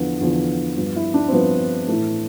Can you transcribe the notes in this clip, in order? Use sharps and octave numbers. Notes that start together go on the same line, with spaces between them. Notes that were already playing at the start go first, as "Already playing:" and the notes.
Already playing: E2 D3 F3 B3
E2 D3 F3 B3
G2 F3 B3
E4
D4
C4
G2 F3 B3
A2 E3 A3